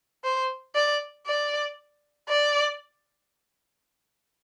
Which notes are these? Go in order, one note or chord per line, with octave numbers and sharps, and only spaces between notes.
C5
D5
D5
D5